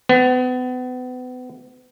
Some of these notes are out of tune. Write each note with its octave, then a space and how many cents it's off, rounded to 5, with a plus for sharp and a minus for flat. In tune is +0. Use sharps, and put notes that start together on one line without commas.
B3 +35